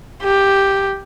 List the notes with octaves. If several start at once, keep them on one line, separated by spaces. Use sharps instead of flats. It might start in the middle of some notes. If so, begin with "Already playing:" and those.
G4